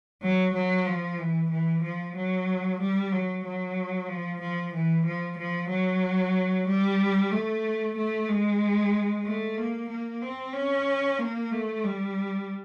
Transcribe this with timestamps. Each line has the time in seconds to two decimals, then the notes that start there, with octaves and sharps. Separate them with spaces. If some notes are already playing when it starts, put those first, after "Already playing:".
0.22 F#3
0.54 F#3
0.86 F3
1.18 E3
1.51 E3
1.82 F3
2.15 F#3
2.80 G3
3.12 F#3
3.44 F#3
4.08 F3
4.41 F3
4.73 E3
5.05 F3
5.38 F3
5.70 F#3
6.67 G3
7.31 A3
7.96 A3
8.28 G#3
9.25 A3
9.57 A#3
9.89 A#3
10.22 C4
10.54 C#4
11.19 A#3
11.51 A3
11.83 G3